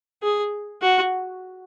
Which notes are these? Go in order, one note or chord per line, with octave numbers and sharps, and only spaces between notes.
G#4
F#4